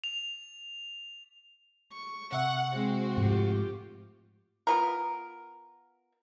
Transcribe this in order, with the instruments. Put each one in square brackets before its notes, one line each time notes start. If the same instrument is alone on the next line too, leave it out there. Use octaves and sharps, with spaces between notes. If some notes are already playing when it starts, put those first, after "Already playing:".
[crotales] F7
[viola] C#6
[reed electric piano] C3 E5 [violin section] F#5
[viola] G#3 [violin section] C4 F#4
[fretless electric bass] G#2 F3 A3 [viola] F4 G4
[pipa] B3 F4 A#4